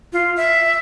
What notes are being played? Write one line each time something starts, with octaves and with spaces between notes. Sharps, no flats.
F4
E5